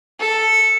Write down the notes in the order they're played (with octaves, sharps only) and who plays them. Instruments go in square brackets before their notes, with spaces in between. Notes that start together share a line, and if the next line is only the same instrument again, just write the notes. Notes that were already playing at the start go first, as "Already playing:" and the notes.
[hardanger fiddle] A4